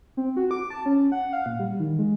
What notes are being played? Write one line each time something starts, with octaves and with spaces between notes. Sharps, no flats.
C4
F#4
D6
A5
C#4
F#5
F5
A#2
G3
D#3
G#3